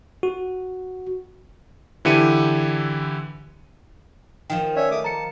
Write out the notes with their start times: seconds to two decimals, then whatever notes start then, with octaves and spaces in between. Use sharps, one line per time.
0.23 F#4
2.05 D3 E3 E4 G4 C#7 D#7
4.50 D#3 F3 G5
4.76 C#4 C#5 D5 E5
4.91 A3 D6 D#6
5.04 A5 A#5 C#7